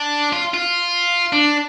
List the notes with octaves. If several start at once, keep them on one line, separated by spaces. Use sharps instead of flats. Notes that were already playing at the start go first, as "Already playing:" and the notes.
Already playing: D4
F4
F4
D4